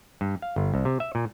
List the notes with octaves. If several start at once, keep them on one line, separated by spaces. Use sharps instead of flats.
G2
F5
G1
C2
C3
E5
A#2